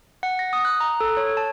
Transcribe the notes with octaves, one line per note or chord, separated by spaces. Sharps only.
F#5
A#6
D#6
F#6
A#5
A4
C#5
A5